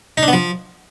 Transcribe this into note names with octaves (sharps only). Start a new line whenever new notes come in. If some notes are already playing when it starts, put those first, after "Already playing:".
D#4
D4
B3
F3